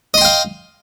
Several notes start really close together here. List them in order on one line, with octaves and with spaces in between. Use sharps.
D#5 C6 G5 F5